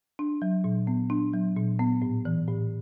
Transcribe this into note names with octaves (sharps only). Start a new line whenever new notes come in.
D4
F#3
A#2
B3
D4
F#3
A#2
B3
A2
E3
A2